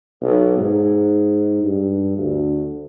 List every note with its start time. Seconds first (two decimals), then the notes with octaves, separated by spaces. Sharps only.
0.22 B1
0.58 G#2
1.64 G2
2.17 D2